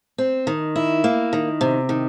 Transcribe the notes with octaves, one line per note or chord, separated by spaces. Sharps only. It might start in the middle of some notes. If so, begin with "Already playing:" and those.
C4
D#3
E4
A#3
D#3
C3
D#3